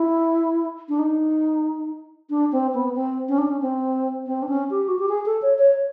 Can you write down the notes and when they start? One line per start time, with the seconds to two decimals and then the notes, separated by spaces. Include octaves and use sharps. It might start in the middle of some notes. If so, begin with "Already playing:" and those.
Already playing: E4
0.89 D4
0.99 D#4
2.30 D4
2.52 C4
2.74 B3
2.95 C4
3.28 C#4
3.38 D4
3.48 C#4
3.62 C4
4.26 C4
4.42 D4
4.49 C#4
4.70 G4
4.88 F#4
4.99 G4
5.09 G#4
5.26 A4
5.42 C#5
5.58 C#5